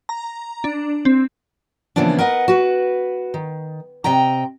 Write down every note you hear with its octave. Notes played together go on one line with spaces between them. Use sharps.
A#5
D4
C4
C#3 E3 F3 A#3 B3 D4
A#4 B4 D#5 F#5
F#4 B4
D#3
C3 D#5 G5 A#5